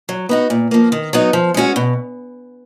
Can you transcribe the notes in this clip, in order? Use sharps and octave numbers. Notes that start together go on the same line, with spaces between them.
F#3
B3 D#4 F#4
A#2
F3 A#3
D#3
F#3 B3 D#4 F#4
F3
G#3 C#4 F#4
B2